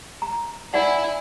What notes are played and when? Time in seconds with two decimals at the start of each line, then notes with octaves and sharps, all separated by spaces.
0.22 A#5
0.74 D#4 E4 D5 F#5 G#5